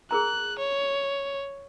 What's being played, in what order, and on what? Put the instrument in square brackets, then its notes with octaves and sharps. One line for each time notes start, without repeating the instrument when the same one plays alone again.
[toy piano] G#4 A#4 A#5 [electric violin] F#6
[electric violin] C#5